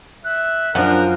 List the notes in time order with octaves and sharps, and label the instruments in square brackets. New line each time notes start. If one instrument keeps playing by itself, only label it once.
[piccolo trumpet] E5 [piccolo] F#6
[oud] F#2 F3 [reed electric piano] D4 F#5 [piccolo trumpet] A#4